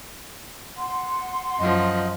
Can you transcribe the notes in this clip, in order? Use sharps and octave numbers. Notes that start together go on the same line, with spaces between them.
F#5 C6
F#2 F3 D#5